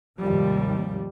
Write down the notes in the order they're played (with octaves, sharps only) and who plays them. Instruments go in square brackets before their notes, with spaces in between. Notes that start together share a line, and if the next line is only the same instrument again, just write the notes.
[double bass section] D#2 G#2 C3 F3 G3